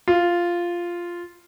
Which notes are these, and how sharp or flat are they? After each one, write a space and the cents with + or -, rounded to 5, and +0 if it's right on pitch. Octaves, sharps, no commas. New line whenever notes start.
F4 -5